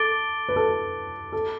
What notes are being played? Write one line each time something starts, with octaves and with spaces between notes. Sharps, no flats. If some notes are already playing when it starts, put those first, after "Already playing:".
Already playing: A4 D6 A6 D7 G7
B4
A4
A4